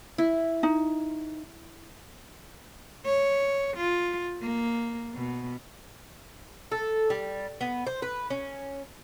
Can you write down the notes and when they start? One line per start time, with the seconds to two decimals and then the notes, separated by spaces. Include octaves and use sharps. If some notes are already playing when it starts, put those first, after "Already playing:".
0.18 E4
0.63 D#4
3.05 C#5
3.77 F4
4.42 A#3
5.14 B2
6.72 A4
7.10 G3
7.61 B3
7.87 C5
8.02 B4
8.30 C#4